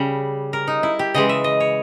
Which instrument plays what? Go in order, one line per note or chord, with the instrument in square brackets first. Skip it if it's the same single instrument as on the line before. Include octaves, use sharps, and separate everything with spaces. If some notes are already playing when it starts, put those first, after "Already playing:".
Already playing: [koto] C#3 G3
A#4
D#4
E4
G4
C#3 E3 G#3 D#5
E5
D#5
C#5